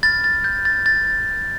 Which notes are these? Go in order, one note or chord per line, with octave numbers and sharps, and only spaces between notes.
B5 F6 A6
A6
G6
A6
A6